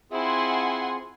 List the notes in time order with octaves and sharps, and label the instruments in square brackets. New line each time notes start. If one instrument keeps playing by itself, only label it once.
[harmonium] C4 F4 G#4 [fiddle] E4 [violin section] F#5 G#5 C6